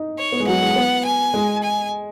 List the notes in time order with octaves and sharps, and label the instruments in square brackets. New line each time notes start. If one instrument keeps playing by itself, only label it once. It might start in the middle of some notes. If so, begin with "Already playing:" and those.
Already playing: [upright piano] D#4
[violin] C#5
[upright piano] B3
G#3
[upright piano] F#3 [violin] F#5
[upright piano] G#3
B3
[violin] G#5
[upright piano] G#3
[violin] G#5